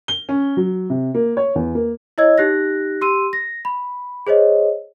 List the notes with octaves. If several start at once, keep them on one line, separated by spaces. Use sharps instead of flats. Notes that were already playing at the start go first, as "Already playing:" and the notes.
G7
C#4
F#3
C3
A#3
C#5
E2
A#3
E4 C#5 D#5 E6 G#6
D#4 G4 F#6 A#6
G4 C6 E6 D#7
A#6
B5
G#4 C5 C#5 D#5